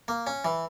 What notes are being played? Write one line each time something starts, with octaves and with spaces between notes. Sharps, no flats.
A#3
C#4
E3